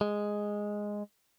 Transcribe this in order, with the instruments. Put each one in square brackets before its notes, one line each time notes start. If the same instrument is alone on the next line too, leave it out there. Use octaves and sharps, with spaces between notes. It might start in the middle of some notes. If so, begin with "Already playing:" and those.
[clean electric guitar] G#3